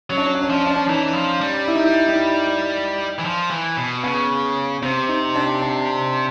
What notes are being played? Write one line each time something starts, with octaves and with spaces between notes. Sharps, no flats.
F#3 C#4
D4
C#4
D4
C#4
F3 D4
C#4
D4
C#4
E3 D#4
F3
G3
E4
D#4
E4
D#4
E3
F3
E3
B2
C#3 B3
C3 C4
D#4
D4
D4